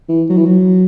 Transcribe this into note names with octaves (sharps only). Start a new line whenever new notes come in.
E3
F#3
E3
F#3